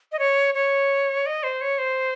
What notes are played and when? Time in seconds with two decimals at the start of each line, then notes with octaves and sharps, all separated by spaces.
0.12 D#5
0.19 C#5
0.54 C#5
1.26 D#5
1.43 C5
1.61 C#5
1.78 C5